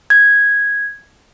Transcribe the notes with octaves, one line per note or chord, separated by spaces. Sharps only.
G#6